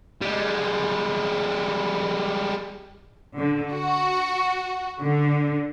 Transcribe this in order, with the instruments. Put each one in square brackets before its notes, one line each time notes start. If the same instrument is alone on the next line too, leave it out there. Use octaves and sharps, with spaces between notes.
[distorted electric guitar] G3 G#3
[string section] D3
F#4
D3